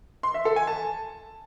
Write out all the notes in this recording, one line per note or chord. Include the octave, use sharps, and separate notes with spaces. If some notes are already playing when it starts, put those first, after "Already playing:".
C6
E5
A4
G#5
A5